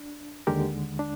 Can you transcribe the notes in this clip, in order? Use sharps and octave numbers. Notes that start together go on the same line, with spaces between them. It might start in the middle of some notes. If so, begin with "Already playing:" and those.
Already playing: D4
D#2 D3 G#3 G4 A#4
D4